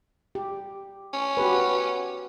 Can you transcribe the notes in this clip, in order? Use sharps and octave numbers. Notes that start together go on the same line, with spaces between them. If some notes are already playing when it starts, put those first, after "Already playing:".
G4
C#4
F#4 G4 B4